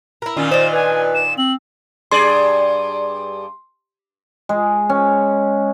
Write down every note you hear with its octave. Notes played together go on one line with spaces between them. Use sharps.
E4 A#4
A#2 D#3 C#4 F4
D4 C5 D#5 E7
B4 G#5
E7
C4 F#7
G2 G#4 D5 C6
G#3
C#4